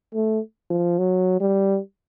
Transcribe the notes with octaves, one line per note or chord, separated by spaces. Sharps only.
A3
F3
F#3
G3